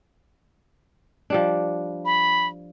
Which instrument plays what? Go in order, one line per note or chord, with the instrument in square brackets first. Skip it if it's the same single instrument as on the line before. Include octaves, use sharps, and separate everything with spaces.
[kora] F3 G3 D4
[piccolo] B5